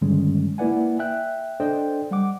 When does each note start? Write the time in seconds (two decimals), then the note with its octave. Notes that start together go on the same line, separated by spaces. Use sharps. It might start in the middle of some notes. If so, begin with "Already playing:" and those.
0.01 G2 D3 D#3 G3 G#3 C#4
0.58 A#3 E4 B4 D5 F#5 G#5
0.99 E5 G5 F#6
1.60 D4 A4 C5 D5 D#5 G5
2.11 G3 F#5 D6